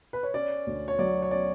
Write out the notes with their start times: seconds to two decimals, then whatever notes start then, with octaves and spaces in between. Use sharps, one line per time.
0.13 B4
0.23 C#5
0.34 C#4 D5
0.67 D2
0.88 C#5
0.99 F#3 D5
1.22 C#5
1.31 C#4 D5